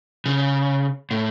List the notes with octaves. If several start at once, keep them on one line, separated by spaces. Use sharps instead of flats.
C#3
A2